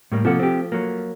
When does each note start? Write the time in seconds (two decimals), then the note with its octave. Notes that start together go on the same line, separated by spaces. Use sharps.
0.12 A2 G3 A#3
0.25 C3 F3 A3 A#3 F#5
0.39 C4 G4
0.72 F#3 A#3